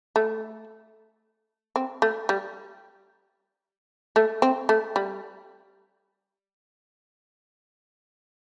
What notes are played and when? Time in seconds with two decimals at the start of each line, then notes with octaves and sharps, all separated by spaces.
0.16 A3
1.76 C4
2.02 A3
2.29 G3
4.16 A3
4.42 C4
4.69 A3
4.96 G3